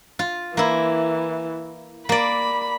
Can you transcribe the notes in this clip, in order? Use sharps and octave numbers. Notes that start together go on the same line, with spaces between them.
F4
E3 A#3 E4
A#3 D5 B5